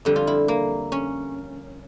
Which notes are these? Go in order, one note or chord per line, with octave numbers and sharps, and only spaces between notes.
F2 D3 G3
F4
E4
A#3
C#4